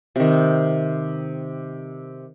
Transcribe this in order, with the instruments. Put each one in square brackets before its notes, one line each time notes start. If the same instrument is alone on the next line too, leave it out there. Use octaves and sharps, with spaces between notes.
[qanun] C3 D#3